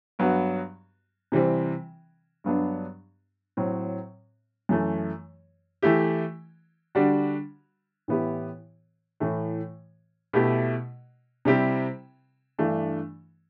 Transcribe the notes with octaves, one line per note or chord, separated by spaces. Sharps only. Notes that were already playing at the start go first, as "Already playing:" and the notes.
G2 F#3 B3 F#4
C3 E3 G3 C4
G2 F#3 B3 D4
A2 F#3 C4
F#2 E3 A3
E3 A3 E4 G4
D3 G3 D4 F#4
A2 E3 B3 E4 G4
A2 E3 A3
B2 A3 E4 G4
C3 G3 C4 E4 G4
G2 E3 A3 D4